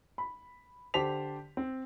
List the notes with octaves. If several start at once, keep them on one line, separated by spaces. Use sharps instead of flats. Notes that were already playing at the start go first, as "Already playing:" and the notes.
B5
D3 G4 C5 A5 B6 F7
C4